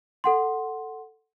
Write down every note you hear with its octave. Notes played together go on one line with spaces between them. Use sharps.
A4 F#5 C6